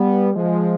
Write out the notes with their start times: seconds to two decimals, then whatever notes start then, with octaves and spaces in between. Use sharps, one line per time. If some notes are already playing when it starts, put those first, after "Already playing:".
Already playing: G3 B3
0.35 F3 G#3